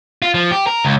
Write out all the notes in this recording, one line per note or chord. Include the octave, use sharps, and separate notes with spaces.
F4
F3
G4
A#4
C#2